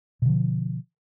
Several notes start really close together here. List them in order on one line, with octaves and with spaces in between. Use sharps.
B2 D3 F3